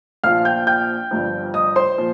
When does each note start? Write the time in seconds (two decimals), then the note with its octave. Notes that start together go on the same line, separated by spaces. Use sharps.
0.23 A#1 A#2 F3 F5 F6
0.45 G5 G6
0.67 G5 G6
1.11 G1 G2 F3
1.54 D#5 D#6
1.76 C5 C6
1.98 A#2 F3